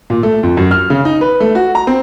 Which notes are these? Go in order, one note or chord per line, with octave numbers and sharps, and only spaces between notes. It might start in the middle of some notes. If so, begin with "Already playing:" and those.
A#2
A3
F2
F#2
F6
C#3
D#4
B4
A3
F#4
A#5
C4